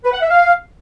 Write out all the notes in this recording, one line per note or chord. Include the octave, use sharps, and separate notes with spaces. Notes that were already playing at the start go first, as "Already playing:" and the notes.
B4
F#5
E5
F5